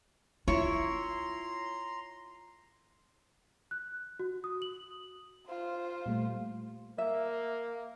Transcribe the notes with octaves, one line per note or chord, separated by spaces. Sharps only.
E4 F4 C#5 A#5 C6
F#6
F#4
D#6
F#7
F4 C5
A#2 G3 A3
A#3 E5